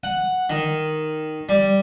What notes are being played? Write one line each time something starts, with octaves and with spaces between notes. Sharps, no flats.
F#5
D#3
G3